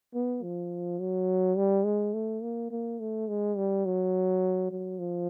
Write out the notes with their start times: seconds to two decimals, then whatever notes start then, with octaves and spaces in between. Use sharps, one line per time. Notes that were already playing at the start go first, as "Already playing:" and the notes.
0.14 B3
0.42 F3
0.99 F#3
1.57 G3
1.85 G#3
2.14 A3
2.42 A#3
2.71 A#3
3.00 A3
3.28 G#3
3.57 G3
3.85 F#3
4.71 F#3
4.99 F3